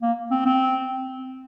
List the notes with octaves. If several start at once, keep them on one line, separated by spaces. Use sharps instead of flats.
A#3
C4
C4